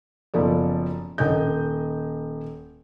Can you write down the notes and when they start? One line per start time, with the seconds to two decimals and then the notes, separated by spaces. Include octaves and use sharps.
0.34 F#1 B2 F3 A4 D5
1.18 D#1 A#3 D#5 G6